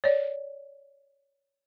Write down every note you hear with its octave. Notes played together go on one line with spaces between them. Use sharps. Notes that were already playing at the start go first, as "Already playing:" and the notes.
C#5 D5